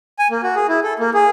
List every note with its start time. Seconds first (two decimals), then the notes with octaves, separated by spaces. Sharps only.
0.19 G#5
0.31 A#3
0.43 F#4
0.56 G#4
0.68 E4
0.84 A4
0.99 A#3
1.14 G#4